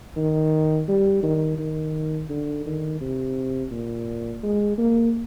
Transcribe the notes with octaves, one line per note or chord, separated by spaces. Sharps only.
D#3
G3
D#3
D#3
D3
D#3
C3
A#2
G#3
A#3